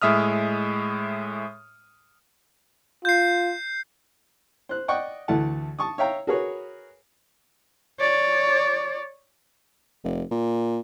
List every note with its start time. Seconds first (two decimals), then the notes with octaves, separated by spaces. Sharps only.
0.02 A2 G#3 E5 D#6 F6
3.05 F4 G6 C7
4.69 C5 F#6
4.88 D5 D#5 F#5 G5 C#6
5.28 D2 E3 A3 E4 F#5 A5
5.79 A5 C#6 D#6
5.98 C#5 E5 F5 G5 A#5
6.27 F#4 G#4 A#4 B4 C#5
7.99 C#5 D5
10.04 F1
10.31 A#2